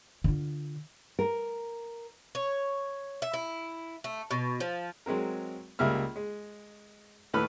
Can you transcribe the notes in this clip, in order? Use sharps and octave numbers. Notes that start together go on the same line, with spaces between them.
D3 F4
A#4
C#5
E5
E4
A3
B2
F3
F#3 G#3 C4 A#4
C#2 G3 A#3 E5 F6
G#3
D#2 A2 A4 B4 B5 F6